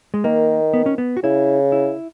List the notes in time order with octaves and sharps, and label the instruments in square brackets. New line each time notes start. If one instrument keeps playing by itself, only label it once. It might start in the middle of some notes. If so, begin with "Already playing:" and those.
[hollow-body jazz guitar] G#3
[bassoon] D#3 [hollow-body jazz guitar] A#3
[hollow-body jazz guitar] B3
C#4
B3
F#4
[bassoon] C#3 [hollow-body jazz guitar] E4
[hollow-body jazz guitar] E4